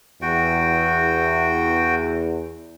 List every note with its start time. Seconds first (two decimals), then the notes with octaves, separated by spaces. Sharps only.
0.22 E2 F#4 G5